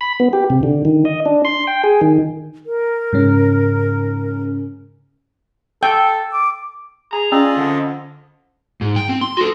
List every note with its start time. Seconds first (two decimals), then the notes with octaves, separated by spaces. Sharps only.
0.01 B5
0.20 B3
0.33 G4
0.50 C3
0.63 D3
0.85 D#3
1.05 D#5
1.26 D4
1.45 C6
1.67 G5
1.84 G#4
2.01 D#3
2.66 A#4
3.13 G#2 C#3 C#4
5.83 A4 G5
6.33 D6
7.13 G#4 A#5
7.32 C#4 F4 G#4 D5 D#5 E6
7.57 F2 G#2 D3
8.81 G#2
8.96 G5
9.09 C4
9.21 C6
9.37 F#4 A4